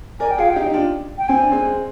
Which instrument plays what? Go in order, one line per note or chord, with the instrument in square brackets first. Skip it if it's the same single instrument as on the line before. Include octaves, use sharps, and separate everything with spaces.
[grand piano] A#4 D5 [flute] G#5
[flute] G5
[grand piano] F4 G#4 [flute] F5
[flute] G5
[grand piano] D#4 G4
D#4
D4 F4
[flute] G5
[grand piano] C4 [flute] G#5
[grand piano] D4
G#3 C4